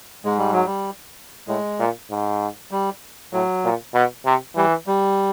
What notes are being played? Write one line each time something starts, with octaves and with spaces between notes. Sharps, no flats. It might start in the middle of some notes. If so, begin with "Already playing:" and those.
G#2 G#3
G3
F#3
G3
A2 G#3
A#2
G#2
G3
A2 F#3
A#2
B2
C3
E3 G3
G3